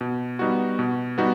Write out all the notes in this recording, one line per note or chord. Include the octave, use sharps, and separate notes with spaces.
B2
G3 B3 D#4 F#4
B2
G3 B3 D#4 F#4